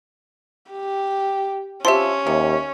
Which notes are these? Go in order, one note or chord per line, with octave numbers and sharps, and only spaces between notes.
G4
F3 C4 C#4 G4 E5 C6
D#2 C3